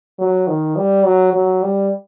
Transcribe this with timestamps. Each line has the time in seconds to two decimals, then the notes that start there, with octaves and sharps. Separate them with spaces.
0.19 F#3
0.47 D#3
0.76 G3
1.05 F#3
1.33 F#3
1.62 G3